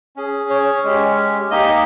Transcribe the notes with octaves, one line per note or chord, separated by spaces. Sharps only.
C#4 G#4
C#5
G#3 C#4 G4
A#3 D#4 G4 D#5